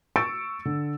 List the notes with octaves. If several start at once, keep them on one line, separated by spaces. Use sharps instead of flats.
C#6 E6 A6 C#7 D7
D3